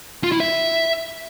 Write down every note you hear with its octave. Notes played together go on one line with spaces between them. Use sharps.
F4
E4
E5